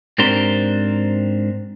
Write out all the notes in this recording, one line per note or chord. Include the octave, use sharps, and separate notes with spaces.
G#2 C4 D4 G4 A#4 C5